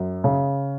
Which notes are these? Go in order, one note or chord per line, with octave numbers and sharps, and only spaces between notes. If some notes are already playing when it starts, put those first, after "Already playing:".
Already playing: F#2
C#3